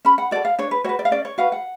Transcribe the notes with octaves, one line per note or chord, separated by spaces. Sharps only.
C#4 B5
F#5
F#4 A4 D5
F5
D4 C#5
B4
F#4 B4 C#5
D5
F5
C#4 D5
C#5
F#4 B4 F5
F#5